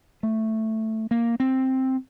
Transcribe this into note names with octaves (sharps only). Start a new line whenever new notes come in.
A3
A#3
C4